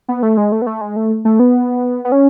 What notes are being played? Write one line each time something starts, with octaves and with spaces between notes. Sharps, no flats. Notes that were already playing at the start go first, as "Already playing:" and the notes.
B3
A3
G#3
A3
B3
A3
G#3
A3
A3
B3
B3
C#4